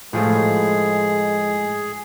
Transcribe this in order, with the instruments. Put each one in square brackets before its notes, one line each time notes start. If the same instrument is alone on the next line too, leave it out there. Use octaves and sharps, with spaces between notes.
[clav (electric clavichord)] A2 F3 A3 [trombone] G#3 [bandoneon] G#4